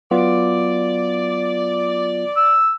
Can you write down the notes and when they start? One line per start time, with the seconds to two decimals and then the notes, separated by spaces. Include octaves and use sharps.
0.11 F#3 B3 F4 D5
2.37 E6